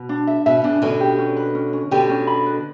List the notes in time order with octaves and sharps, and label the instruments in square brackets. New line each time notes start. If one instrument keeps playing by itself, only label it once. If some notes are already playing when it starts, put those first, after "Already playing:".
Already playing: [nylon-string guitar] B2
[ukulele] D4
E5
[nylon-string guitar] B2 [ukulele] E5
[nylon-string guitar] C#3 [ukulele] D4
[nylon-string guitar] B2 D3 [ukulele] C#4
[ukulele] G4
C#4
B4
C#4
C#4
[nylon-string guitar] B2 D3 [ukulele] G4
[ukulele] C#4
B5
B4